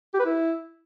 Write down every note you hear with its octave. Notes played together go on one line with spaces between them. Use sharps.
G4
B4
E4